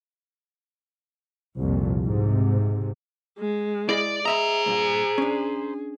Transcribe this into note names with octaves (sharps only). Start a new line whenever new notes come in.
C2 F2 A#2
G#2 C3
G#3
E4 G#4 D5 D#5
G#4 C5 D#5 E5 A#5 B5
C2 G2 A#2
C#4 D4